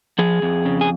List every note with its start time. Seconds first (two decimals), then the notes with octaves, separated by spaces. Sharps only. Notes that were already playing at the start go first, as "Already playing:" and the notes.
0.19 F3 G#4
0.42 F2
0.65 C#3
0.81 G#4